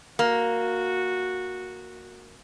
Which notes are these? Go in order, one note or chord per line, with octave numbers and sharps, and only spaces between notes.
A#3 F#4